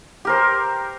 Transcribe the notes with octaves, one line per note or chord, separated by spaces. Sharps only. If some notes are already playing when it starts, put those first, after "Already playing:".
G4 A#4 C5